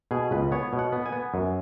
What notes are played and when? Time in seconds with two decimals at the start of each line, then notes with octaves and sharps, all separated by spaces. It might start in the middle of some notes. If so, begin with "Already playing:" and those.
0.11 B2 G#4
0.31 C#2 B4
0.52 B3 C#5
0.73 B2
0.79 F#5
0.92 B3
1.06 G#5
1.12 B3
1.34 F#2